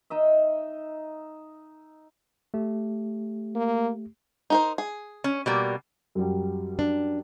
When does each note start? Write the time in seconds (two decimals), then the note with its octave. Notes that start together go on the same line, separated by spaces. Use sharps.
0.10 D#4 D#5 E5
2.54 A3 G4
3.56 A#3
4.50 D#4 A#4 C5
4.78 G#4
5.24 C#4
5.46 B2 G3 A#3
6.15 F#2 F#3 G3
6.79 D4